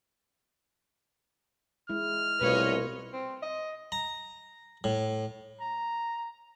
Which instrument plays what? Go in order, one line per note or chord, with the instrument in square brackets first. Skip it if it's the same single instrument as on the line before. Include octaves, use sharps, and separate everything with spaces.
[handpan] G#3 E4 [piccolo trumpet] F6
[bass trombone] C2 [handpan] B2 A3 F4 [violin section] B4 C#5 D#5
[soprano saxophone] C4
D#5
[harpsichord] A#5
A2
[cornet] A#5